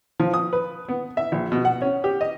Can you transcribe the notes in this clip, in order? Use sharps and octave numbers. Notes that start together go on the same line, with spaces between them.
F3
D#6
B4
B3
E5
A#1
B2
F#5
C#4
G4
D#5